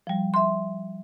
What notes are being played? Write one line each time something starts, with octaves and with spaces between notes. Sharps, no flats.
F3 G3
E5 C6